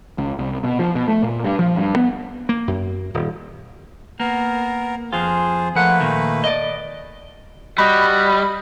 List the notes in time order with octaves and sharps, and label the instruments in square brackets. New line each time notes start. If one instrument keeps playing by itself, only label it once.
[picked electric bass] C#2
C2
B2
F3
B2
A3
A#2
G2
F3
G2
B3
[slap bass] A#3
F#2
D#1
[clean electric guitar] A#3 [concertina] B3 A#4
[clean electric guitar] F2 F4 [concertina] G#4 C5
[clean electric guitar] F3 F#5 [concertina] A3 A#3 B4
[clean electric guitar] A#2 D#3
D5 D#5
[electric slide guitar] G3 [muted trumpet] F#4 [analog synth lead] D#5 [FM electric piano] B5